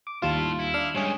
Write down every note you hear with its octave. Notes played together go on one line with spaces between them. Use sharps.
D6
D#2 G3 E4 F4 A5
E4
D4 F5 F6
G2 G3 G#3 C#4 G#4